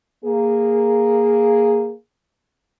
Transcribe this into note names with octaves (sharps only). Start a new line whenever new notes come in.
A#3 G#4